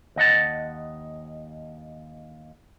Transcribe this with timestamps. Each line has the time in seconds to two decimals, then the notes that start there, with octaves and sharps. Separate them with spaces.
0.16 D#2 D#5 F#5 A5